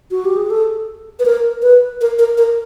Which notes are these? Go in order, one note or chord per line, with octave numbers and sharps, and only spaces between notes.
F#4
G4
G#4
A4
B4
A#4
B4
A#4
A#4
A#4